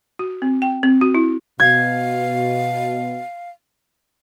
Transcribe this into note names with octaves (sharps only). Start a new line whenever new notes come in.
F#4
C4
G5
C4
F#4
E4
B2 F5 G#6